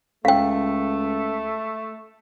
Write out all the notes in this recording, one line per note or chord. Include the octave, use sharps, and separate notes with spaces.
C#2 A3 F5 G5